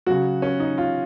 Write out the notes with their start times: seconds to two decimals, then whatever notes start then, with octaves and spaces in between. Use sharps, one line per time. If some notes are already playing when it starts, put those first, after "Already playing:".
0.07 C#3 F#3 F#4
0.42 C#4
0.60 D#4
0.78 F4